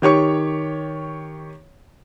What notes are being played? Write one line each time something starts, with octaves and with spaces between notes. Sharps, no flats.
D#3 G4 C#5 C#6